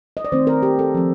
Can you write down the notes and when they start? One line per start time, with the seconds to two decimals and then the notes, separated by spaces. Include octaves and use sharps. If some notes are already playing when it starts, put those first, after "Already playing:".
0.17 D#5
0.25 D5
0.32 D#3 A3 C4 C5
0.47 A#4
0.63 G4
0.79 A4
0.95 F3 C4